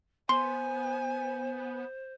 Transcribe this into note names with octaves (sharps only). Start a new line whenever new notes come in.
B3 C5 G#5 C6